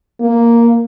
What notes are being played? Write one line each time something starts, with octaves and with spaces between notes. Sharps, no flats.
A#3